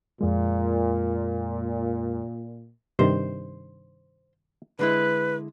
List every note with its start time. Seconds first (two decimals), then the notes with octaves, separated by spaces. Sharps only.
0.21 F2 A#2 G#3
2.99 G2 C3 D#3 C5
4.79 D3 G#3 E4 B4